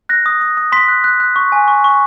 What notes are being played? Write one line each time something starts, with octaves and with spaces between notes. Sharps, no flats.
F#6 A#6
D#6
D#6
D#6
C6 B6
F#6
F#6
F#6
C#6
G#5
C#6
C#6